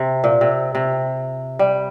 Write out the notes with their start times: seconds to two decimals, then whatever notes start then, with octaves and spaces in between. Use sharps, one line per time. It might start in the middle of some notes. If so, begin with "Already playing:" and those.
Already playing: C3
0.24 A#2
0.41 C3
0.75 C3
1.59 G3